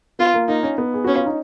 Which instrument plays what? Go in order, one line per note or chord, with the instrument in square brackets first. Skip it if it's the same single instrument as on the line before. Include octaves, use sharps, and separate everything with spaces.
[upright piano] B3 [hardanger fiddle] F4
[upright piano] A#3
[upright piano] A#3 [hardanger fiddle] D#4
[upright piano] C#4
B3
G#4
[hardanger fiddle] C#4 [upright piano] F#4
[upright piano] F4
D#4